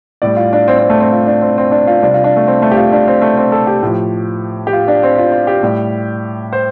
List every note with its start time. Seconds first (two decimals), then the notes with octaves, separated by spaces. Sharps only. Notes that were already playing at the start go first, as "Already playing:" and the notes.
0.22 A2 G3 D5
0.36 F4
0.53 D4
0.68 C4
0.79 C4
0.90 A3
1.00 C4
1.12 F4
1.27 D4
1.42 C4
1.58 C4
1.72 D4
1.87 F4
2.03 C3 G3 D4
2.14 F4
2.24 D4
2.36 A3
2.47 C4
2.62 A3
2.71 G4
2.77 F4
2.93 D4
3.07 C4
3.22 A3
3.37 C4
3.52 A4
3.67 G4
3.83 A2 F3
4.67 G4
4.73 F4
4.88 D4
5.03 C4
5.18 F4
5.32 F4
5.47 G4
5.63 A2 G3
6.53 C5